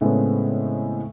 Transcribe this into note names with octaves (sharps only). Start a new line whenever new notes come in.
A2 C#3 G#3 A3 B3 C4